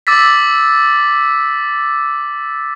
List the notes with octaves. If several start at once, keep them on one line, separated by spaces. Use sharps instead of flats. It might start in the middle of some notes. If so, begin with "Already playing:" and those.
D6 E6 A6 B6